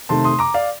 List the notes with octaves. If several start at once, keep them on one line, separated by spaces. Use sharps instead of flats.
C3 D#3 A3 A5 C6
C6 D#6
A#5 D6
D5 F5